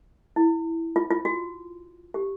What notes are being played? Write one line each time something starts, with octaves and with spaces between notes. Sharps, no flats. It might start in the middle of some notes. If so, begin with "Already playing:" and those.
E4
F4
F4
F#4
G4